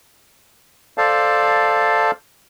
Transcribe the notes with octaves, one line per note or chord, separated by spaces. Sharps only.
A4 C5 D5 F5 A5